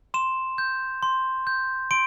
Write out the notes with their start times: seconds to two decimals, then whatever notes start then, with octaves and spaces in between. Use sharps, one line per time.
0.14 C6 E7
0.58 G6
1.03 C6
1.47 G6
1.91 C6 D7